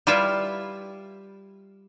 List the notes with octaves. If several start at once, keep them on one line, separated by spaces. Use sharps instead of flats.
G3 E4 F4 B4 E5